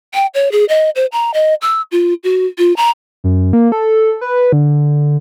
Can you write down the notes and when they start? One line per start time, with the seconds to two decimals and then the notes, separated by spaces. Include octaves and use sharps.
0.14 G5
0.34 C#5
0.52 G#4
0.69 D#5
0.96 C5
1.12 A#5
1.34 D#5
1.62 E6
1.92 F4
2.24 F#4
2.58 F4
2.77 A#5
3.24 F#2
3.53 A#3
3.72 A4
4.21 B4
4.52 D3